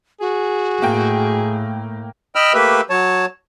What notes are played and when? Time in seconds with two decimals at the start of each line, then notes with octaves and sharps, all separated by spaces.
0.21 F#4 G#4
0.82 A2 A#3 G5
2.35 D#5 G5 B5 E6 F6
2.54 A3 A#3 G4 B4 E5
2.90 F#3 C#5 A5